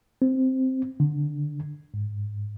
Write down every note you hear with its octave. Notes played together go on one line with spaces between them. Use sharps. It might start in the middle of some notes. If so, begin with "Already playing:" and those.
C4
D3
G#2